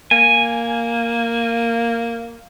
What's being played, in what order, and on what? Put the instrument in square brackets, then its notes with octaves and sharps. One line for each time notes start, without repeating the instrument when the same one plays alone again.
[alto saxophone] A#3 [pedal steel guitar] G#5